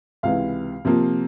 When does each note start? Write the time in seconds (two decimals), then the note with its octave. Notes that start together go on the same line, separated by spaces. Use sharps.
0.23 C#2 C3 E3 F5
0.85 C3 F3 A#3